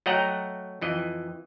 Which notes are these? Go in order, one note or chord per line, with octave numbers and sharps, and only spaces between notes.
F#3 A3 D#5 F#5 G5 A#5
F2 E3 D#5